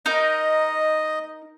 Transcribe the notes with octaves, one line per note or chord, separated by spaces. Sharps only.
D#4 A#4 D#5